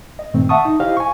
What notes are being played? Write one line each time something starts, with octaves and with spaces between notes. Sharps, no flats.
D#5
G2 A#2 D#3 A3 C4
E5 F#5 A5 C#6 D#6
D#4
E4 G4 C5 D#5 F5
G#5 C#6